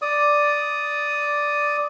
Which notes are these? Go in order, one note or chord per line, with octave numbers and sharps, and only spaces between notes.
D5 D#6